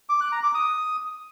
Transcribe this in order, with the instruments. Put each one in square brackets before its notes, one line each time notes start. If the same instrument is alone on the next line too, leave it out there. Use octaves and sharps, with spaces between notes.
[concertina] D6
F#6
A#5
D6
D#6